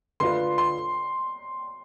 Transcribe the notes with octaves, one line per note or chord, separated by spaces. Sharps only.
D3 A3 D4 F4 B4 C6
C6